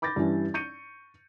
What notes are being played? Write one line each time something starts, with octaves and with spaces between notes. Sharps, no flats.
B5 D6 G6 A6 A#6
G2 E3 C#4 E4
C#6 G6 C#7 D#7